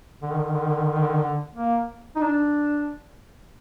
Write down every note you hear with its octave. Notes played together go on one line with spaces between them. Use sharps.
D3
D#3
D3
D#3
D3
D#3
D3
D#3
D3
D#3
D3
D#3
D3
A#3
D#4
D4